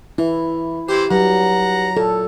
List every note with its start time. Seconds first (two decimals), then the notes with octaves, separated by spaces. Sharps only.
0.18 E3 E4
0.89 E3 G4 C5
1.11 G2 F#3 F#5 A#5
1.97 A#2 A4